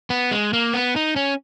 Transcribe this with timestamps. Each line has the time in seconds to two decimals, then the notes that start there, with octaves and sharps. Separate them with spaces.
0.10 B3
0.31 G#3
0.53 A#3
0.74 B3
0.96 D#4
1.16 C#4